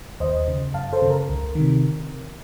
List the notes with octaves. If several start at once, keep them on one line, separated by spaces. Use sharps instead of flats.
D#2 C5 D#5
C#3
F#2 F5 A5
A4 C5
C#3
A#4
C#2
D#3
C3